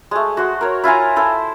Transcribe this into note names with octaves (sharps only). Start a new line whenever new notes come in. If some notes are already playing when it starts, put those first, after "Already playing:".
G#3 A3
F#4 C5
A#4 C#5
E4 F4 G#5 A#5
E4 A4 C5